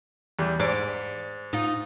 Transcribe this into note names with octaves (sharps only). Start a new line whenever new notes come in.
E2 G3
G#2 D5
D#4 F4